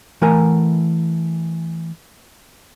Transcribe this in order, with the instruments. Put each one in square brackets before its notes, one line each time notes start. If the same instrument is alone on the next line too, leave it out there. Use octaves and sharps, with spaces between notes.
[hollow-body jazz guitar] E3 A3 A#4 F#5 G#5 A#5